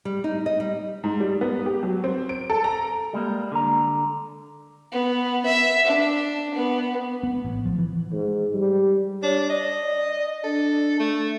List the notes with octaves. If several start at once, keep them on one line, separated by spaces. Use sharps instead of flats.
G3
D#4
D#5
G3
G#2
G3
B3
G4
F#3
C4
D7
A4
A#5
G3 G#3 A#3
D3 A#5
B3
E5
D4
B3
B3
A1
F3
E3
G#2
G3
D4 C#5
D5 D#5
D4 A4
A3